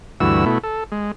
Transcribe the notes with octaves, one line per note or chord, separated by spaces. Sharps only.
D2 G2 E3 F#4 E6
B2 A3 E4
A4
G#3